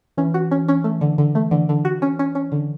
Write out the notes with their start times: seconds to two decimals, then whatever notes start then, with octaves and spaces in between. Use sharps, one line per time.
0.17 E3 C#4
0.34 F#4
0.51 C#4
0.68 C#4
0.84 A3
1.01 D3
1.18 D3
1.35 A3
1.51 D3 E3
1.69 D3
1.85 F#4
2.02 C#4
2.19 C#4
2.35 C#4
2.52 D3